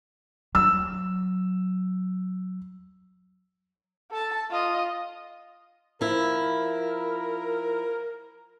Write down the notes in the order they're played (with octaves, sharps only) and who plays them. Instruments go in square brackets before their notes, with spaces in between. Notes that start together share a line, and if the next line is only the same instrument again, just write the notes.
[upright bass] F#3 [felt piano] E6
[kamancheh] A4 A5
F4 D#5
[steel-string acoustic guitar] F3 E4 [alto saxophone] A#4